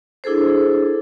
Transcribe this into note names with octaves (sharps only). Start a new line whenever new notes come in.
D4 E4 G#4 A4 C5